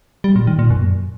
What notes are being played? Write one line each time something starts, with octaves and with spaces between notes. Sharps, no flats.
G3
A#2
D#3
A#2
F#2